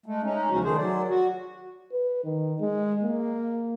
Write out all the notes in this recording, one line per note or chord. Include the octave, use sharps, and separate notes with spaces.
G#3 A3
G#3 C#4 D#4
D#2 C#3 F3 F#4
D#3 A3 G#4 C5
F#3 D5
F#4
B4
D#3
G#3
A#3